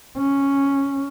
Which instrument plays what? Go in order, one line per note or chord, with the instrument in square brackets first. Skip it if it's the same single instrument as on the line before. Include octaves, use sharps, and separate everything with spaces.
[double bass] C#4